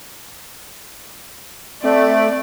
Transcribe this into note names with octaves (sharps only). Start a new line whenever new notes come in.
A3 C4 D5